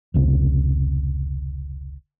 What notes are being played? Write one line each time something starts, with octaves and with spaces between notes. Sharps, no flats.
F1 C#2 C3